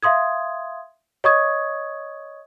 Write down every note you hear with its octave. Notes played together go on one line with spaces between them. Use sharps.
E5 F5 C6 D#6 G#6
C#5 D#5 C#6 D#6 G#6